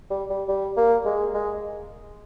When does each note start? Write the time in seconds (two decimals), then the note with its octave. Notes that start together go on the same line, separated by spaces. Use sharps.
0.10 G3
0.30 G3
0.48 G3
0.77 A#3
1.05 G#3
1.34 G#3